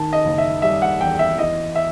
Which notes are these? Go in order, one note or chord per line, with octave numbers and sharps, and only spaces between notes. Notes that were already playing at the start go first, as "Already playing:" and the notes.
Already playing: D#3 A5
D#5
F#1
E5
G3 E5
F#5
E2 G5
E5
E3 D#5
E5